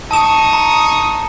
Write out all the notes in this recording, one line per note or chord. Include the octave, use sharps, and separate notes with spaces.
D#4 A5 C#6 D#6 E7
A#5